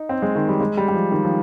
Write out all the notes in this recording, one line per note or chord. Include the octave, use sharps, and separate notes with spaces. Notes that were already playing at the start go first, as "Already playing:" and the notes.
Already playing: D#4
C4
G#3
D#3
G3
G#3
G3
G3
F3
D#3
F3